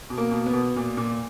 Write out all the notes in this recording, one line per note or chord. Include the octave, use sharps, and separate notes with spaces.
B2
A#3
B2
B3
B2
A#2
A#2